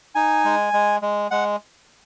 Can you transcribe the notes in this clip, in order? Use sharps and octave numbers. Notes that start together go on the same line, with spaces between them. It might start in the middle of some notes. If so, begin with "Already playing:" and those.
D#4 G#5
G#3
G#3
G#3
G#3 F#5